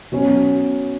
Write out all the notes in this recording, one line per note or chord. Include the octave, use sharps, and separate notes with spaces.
B2 F#3 C#4